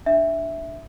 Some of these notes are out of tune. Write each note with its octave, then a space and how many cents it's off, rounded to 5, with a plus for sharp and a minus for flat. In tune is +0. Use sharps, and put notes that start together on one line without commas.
D4 +0 E5 +0